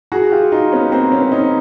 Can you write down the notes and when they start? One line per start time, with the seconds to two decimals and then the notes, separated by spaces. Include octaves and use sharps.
0.12 F#4 G#4
0.32 F4 G4
0.52 D#4 F4
0.72 B3 C#4
0.92 A#3 C4
1.12 B3 C#4
1.32 C#4 D#4